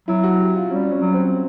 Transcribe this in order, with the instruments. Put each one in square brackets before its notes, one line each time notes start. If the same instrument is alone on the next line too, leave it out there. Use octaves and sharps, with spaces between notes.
[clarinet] F#3 [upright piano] E4
[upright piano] F#4
G4
F4
[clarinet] G3 [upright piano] C#4
[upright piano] C#4
[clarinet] F#3
[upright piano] C4